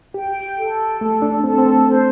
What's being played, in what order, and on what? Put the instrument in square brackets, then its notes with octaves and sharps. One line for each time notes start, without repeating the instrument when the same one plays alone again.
[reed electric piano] G4 [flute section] G5
[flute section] A4
[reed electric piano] A3 [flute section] A4
[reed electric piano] D4
[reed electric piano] C4 [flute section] A4
[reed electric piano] C4
A3
[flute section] C5